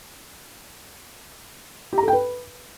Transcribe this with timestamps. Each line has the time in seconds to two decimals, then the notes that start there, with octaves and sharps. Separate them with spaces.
1.93 G4
1.98 A#5
2.03 A4
2.08 G5
2.13 B4